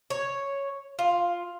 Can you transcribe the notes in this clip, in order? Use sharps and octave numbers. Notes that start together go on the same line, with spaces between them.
C#5
F4